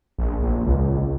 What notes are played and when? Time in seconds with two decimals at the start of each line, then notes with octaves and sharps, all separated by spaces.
0.18 A#1
0.43 A#1
0.66 C#2